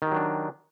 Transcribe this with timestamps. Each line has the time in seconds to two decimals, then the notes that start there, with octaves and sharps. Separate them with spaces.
0.02 D#3
0.07 G4
0.11 F#3
0.16 D4